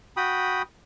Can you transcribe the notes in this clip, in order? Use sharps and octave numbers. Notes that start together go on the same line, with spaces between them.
F#4 G5 B5 D#6